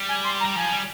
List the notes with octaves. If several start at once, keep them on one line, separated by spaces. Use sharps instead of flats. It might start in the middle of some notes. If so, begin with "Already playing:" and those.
Already playing: G3
G#5
C6
A#5
G3
F3 G#5
G3